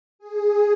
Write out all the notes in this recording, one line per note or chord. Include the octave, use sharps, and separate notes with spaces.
G#4